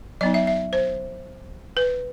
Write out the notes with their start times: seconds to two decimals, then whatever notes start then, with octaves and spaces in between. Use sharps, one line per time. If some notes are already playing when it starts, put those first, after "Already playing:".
0.21 F#3 B3 D#4 D#5
0.34 E5
0.47 E5
0.73 C5
1.77 B4